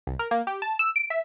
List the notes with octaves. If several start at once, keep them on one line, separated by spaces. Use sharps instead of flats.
C2
A#4
A#3
G4
A5
E6
D7
E5